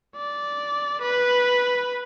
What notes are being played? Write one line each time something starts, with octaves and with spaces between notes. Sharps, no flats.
D5
B4